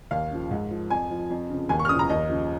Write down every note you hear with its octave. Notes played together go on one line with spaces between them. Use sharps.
D#2 F5
C#3 F3
G#2
F3
F2 G#5
F3
F2
C#3 F3
D#2 G#5
C#6
F6
C#3 F3 D#6
A#5
D#2 D#5
C#3 F3